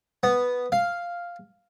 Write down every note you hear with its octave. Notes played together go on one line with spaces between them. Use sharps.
B3
F5